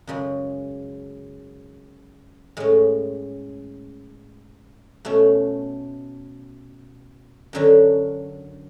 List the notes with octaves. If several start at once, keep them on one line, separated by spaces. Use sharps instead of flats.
F#2 C#3 G#3
A2 G#3 C#4
B2 A3 C#4
F#2 D3 F#3 C#4